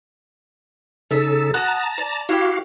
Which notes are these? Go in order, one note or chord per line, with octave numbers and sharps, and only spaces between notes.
C#3 D#4 A4 E5
F#4 A5 A#5 D#6 F#6
D5
E4 F#4 G4 F5